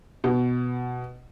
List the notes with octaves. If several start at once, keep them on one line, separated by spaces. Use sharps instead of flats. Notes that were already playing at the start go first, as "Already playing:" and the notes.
B2